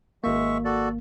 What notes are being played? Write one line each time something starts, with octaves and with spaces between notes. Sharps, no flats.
G#1 G#3 A#3 E5 C#6
F#4 A4 D5